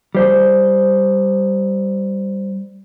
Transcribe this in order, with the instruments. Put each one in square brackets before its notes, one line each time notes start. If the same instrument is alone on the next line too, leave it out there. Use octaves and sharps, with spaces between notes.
[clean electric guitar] G3 C5